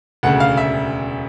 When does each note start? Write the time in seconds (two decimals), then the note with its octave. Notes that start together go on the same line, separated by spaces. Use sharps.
0.23 E1 D2 C#3 F#5
0.40 F5
0.57 E5